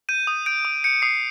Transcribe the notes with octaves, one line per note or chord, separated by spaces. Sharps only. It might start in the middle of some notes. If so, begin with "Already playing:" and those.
G6 D#7
D#6
G6 D7
D#6
G6 C#7
D#6 C7